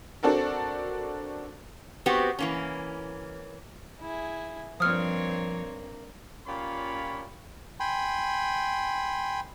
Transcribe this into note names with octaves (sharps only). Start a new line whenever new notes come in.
C4 D4 F#4 A4 A#4
B3 C4 F#4 G4
E3 A#3 C#4
E4 G#4
G2 F3 A#3 C4 C#5 D#6 F6
A#2 C#4 F4 G4 C#5 B5
G5 G#5 B5 C6